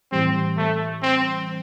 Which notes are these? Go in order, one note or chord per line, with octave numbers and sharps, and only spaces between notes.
A2 E3 G3 C4
A3
C4